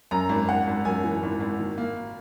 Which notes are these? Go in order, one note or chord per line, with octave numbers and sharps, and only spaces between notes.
F#2 A#5
G#1
G#1 F#5
G#1
F#2 G#5
E3
G#1
G#1
D#3
A#3